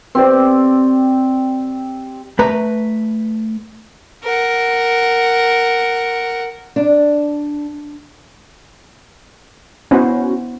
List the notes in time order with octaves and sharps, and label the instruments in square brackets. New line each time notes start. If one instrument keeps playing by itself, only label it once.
[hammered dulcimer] C4 G4 D5
[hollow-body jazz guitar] A3 B4 A#5
[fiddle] A#4 F#5
[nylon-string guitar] D4
[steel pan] B3 E4 C5 [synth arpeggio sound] C#4 F#4